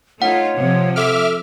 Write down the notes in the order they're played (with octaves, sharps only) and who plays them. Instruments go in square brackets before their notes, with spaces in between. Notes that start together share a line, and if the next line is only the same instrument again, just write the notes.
[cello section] A3 D#4 F4 [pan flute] C#5 [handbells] F#5
[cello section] C3 F3
[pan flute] A4 [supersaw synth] E5 D6 F6